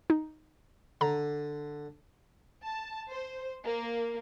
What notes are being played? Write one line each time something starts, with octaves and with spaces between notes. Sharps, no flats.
D#4
D3 A#5
A5
C5
A#3